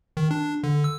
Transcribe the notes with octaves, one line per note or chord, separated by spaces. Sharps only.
D#3
D4
D3
E6